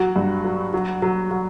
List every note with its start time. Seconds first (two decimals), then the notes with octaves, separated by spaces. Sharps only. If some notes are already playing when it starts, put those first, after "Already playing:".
Already playing: F#3 F#4
0.16 G2
0.45 F#3
0.74 F#3
1.02 F#3
1.31 F#3